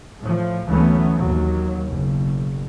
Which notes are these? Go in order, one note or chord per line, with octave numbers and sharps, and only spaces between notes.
A2 F3
D2 E3 F#3 A3 B3 C#4
D#2 F#3
F#1 B2